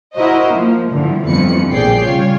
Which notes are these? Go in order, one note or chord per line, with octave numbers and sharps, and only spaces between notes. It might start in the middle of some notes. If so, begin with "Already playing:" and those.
E4 F#4 A#4 C5 D#5
F3 A#3
G2 D3 E3 F3
G1 F2 E3 F3 B4 C#7
A#1 C3 G#4 D5 G5 C7
C#3 G3 F4 C#5